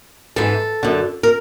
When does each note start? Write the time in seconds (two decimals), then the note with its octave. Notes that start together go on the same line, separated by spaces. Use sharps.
0.36 G#2 E3 A4
0.83 F#2 D3
1.23 A#4